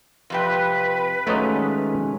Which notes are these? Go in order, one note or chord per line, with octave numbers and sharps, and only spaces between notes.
F2 C3 B4 G5
A#2 D#3 F#3 G#3 A3 C#4 C#5 D#5